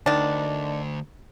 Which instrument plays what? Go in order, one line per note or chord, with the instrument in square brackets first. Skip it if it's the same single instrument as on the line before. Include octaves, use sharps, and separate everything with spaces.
[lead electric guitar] D2 [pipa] D#3 D4